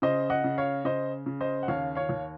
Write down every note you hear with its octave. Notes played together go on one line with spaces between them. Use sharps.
C#3 C5 D#5
D#5 F#5
C#3
C#5 F5
C#3 C5 D#5
C#3
C5 D#5
F#5
D#2 C#5 F5
C#5 F5
D#2